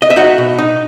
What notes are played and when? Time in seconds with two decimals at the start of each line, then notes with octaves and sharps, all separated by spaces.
0.02 D#5
0.10 E5
0.16 D#4 F#4 F#5
0.38 B2
0.58 D#4